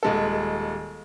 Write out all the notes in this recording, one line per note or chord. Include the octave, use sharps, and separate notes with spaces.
D#1 G#3 A4